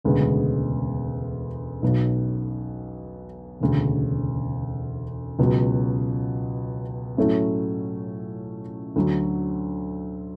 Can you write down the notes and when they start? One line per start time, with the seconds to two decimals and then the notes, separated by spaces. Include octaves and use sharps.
0.04 E1 D2 C#3 G#3 B3
1.82 B1 B2 F#3
3.60 E1 D2 C#3
5.39 C#2 B2 F#3
7.17 A2 F#3 A3 C#4 E4
8.96 D2 D3 F#3